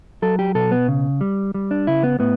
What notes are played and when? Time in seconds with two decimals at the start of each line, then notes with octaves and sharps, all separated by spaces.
0.22 F#3 A4
0.39 G4
0.55 B2 A4
0.71 B3
0.88 C#3
1.21 G3
1.54 G3
1.71 D4
1.87 C#3 E4
2.03 B3
2.20 A2 B3